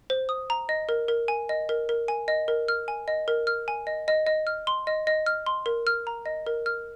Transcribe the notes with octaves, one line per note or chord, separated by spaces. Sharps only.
C5
D#6
A#5
D#5
A#4
A#4
G#5
D#5
A#4
A#4
G#5
D#5
A#4
F6
G#5
D#5
A#4
F6
G#5
D#5
D#5
D#5
F6
C6
D#5
D#5
F6
C6
A#4
F6
A#5
D#5
A#4
F6